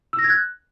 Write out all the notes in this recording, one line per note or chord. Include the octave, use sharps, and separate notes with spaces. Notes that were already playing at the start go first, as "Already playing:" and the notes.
E6
A#6
G#6
F#6